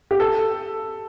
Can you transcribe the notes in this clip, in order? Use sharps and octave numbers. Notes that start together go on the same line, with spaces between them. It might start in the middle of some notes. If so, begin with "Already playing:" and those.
G4
A4